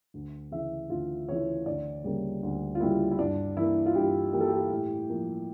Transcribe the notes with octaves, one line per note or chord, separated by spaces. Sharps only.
D2
C#3 E3 E5
D2 F4
C#3 E3 C#5
D2 D5
C#3 G3 A#3
D2
F4
C#3 G3 A#3 E4
E4
G2 D4
E3 A#3 E4
F4
G2 G4
E3 A#3 G4
A4
G4
A2
F3 A#3